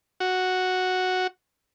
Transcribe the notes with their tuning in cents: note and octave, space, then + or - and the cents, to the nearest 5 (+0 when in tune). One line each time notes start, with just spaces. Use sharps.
F#4 -5